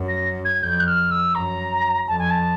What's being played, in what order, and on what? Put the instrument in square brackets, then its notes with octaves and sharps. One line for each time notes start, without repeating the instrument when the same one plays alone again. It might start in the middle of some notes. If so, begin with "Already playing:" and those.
Already playing: [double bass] F#2
[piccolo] A#6
G#6
[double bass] F2 [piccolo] G6
[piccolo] F#6
F6
E6
[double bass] F#2 [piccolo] A#5
[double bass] F2 [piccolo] A5
[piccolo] G#5
A5